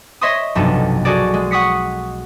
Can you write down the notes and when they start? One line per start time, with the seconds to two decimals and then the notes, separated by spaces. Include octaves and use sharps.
0.21 C#5 D#5 E5 C6 C#6 D#6
0.55 F1 B1 G2 A4
1.05 F#4 G#4 A4 D5
1.34 G#3
1.51 F#5 C#6 D#6 B6 C#7